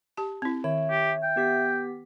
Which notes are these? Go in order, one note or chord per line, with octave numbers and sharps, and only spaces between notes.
G4 A5
C4 E4
D#3 C#5 E5
G4
G5
B3 G4 B6